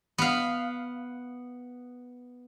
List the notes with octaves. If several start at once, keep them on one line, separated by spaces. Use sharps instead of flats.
B3 F5